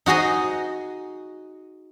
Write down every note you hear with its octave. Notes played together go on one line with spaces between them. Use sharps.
D#4 F#4 G#4 D#5